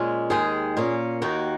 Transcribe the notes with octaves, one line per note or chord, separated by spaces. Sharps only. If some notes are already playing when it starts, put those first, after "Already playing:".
Already playing: A#2 G#3 C#4
D#2 D#3 G#3 G#4
A#2 A#3 C#4
D#2 D#3 A#3 D#4 F#4